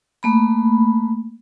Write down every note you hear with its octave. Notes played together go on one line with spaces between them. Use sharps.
A3 A#3 B5